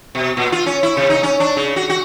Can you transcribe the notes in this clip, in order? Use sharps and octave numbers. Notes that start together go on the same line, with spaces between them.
B2
A#2
F4
C#4
E4
C3
D#4
C#4
D4
C#3
F#4
F#4